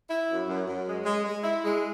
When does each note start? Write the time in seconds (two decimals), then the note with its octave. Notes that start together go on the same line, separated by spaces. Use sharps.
0.09 E4
0.28 F#2
0.48 F#2
0.66 F#2
0.86 G#3
1.05 G#3
1.25 G#3
1.44 E4
1.63 G#3